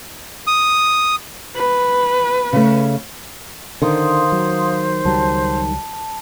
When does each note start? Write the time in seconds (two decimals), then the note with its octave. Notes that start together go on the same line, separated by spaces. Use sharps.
0.47 D#6
1.56 B4
2.53 C#3 A3
3.82 D3 D#3 C5 F5 C6 D#6
4.32 F#3
5.05 C#2 F#3 G3 A5